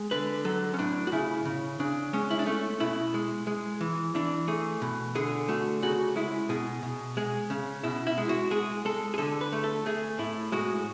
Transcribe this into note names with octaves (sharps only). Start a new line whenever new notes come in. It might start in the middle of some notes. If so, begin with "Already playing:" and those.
Already playing: G#3
D3 B4
F#3 A4
C#4
A2 D4
F#4
C#3 E4
C#3
C#3 D4
G#3 C#4
E4
D4
A3 C#4
B2 E4
G#3
G#3
E3
E3 D4
A3 G#4
B2
D3 G#4
A3 F#4
C#3 F#4
G#3 E4
B2 G#4
B2
G#3 G#4
C#3
B2 E4
E4
G#3
F#4
G#3 G#4
G#3 A4
G#4
D3 A4
B4
A3
A4
A3 G#4
A2 E4
G#3 F#4